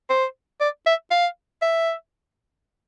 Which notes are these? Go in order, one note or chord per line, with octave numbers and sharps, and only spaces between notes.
C5
D5
E5
F5
E5